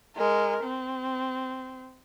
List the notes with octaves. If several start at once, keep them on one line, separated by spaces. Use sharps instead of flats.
G#3 A#4
C4